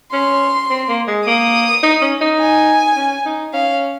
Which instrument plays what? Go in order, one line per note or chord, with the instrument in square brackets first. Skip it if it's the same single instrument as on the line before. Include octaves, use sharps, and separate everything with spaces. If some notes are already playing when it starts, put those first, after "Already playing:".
[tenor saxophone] C#4 [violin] C6
[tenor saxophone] C4
A#3
G#3
[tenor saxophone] A#3 [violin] D#6
[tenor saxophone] D#4
C#4
D#4
[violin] G#5
[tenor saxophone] C#4
D#4
[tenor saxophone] C#4 [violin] F5